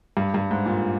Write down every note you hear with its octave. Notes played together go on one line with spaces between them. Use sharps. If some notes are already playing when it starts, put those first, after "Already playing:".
G2
G2
G#2
A#2